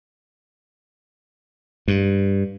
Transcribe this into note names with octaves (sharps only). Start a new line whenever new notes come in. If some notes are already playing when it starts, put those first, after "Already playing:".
G2